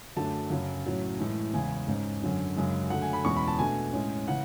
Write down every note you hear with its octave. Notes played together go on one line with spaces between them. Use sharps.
F#2 D3 F#3 A3 D4 A5
F#2 C#3 F#3 C#4
A2 F#3 C#4
A2 E3 G#3
E2 C#3 G#3 G#5
G#2 G#3 C#4
F#2 D3 F#3 C#4
F#2 C#3 G#3 D4
D3 F#3 A3 F#5
G#5
B5
E2 B2 G#3 C#4 C#6
B5
A5
B2 A3 D4 G#5
A2 G#3 C#4
C#3 E3 F#5